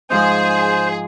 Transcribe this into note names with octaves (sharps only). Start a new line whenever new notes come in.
G#2 F3 D#4 G#4 C5